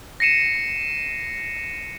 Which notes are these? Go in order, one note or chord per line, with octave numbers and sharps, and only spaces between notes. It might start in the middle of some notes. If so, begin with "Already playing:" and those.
A#6 C7 C#7 D#7 E7